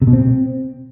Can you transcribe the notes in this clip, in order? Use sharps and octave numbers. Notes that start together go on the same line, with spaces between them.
C3
B2
C4